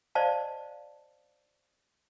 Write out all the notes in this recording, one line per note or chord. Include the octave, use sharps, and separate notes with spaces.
C5 D5 D#5 F5 A5